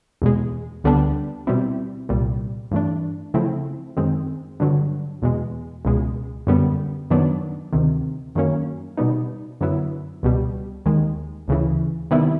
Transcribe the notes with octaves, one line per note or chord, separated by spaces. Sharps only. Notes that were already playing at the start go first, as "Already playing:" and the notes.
E2 B2 G#3
D2 D3 G3 B3 D4
B2 G3 C4 E4
C2 A#2 G3
G2 E3 A3 D4
C#3 F3 A3 C4 E4
F#2 D#3 G#3 C4
G2 D3 F#3
E2 B2 G#3
C#2 B2 G#3
F#2 D3 G3 B3
F#2 D#3 F#3 B3 D4
D2 C3 D#3
F#2 D#3 F#3 A#3 C#4
B2 G3 B3 D#4
F#2 D3 F#3 B3 E4
C#2 B2 G3
D#2 D#3 G#3
D2 C#3 E3
C3 D#3 G3 B3 E4